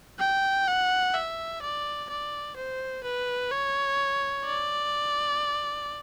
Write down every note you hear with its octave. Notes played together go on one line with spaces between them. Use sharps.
G5
F#5
E5
D5
D5
C5
B4
C#5
D5